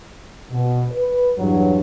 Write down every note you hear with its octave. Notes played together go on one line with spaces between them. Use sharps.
B2
B4
E2 G2 F#3